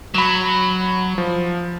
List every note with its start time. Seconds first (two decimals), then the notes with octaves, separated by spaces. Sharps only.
0.14 F#3 B5 E7
1.18 F3